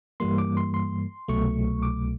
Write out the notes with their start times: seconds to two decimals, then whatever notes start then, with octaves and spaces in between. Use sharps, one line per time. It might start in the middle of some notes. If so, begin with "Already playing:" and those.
0.20 G2 E3 G3 A#3 C6
0.38 D6
0.57 C6
0.74 C6
1.28 C2 B2 F#3 A3 C#6
1.83 D6